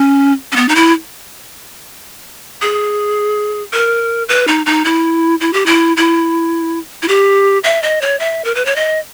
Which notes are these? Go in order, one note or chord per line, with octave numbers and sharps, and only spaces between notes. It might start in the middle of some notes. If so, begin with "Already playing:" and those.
Already playing: C#4
C#4
B3
D#4
E4
G#4
A#4
B4
D#4
D#4
E4
E4
G4
E4
E4
E4
G4
E5
D#5
C#5
E5
A#4
B4
C#5
D#5